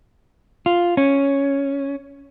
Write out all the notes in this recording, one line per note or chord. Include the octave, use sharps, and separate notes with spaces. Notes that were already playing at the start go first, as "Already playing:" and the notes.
F4
C#4